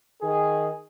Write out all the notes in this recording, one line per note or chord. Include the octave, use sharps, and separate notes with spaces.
D#3 G#4